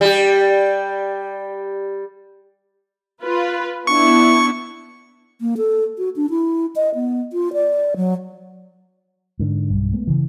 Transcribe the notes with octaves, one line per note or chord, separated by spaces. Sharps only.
G3 G4
F4 B4
B3 D4 E4 C#6
A#3
A4
F#4
D4
E4
D#5
B3
F4
D5
F#3
G#2 D3
B1 G2
G#3 A3 B3
C#3 E3